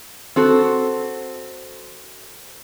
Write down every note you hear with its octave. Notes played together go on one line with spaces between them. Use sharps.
C4 F#4 A4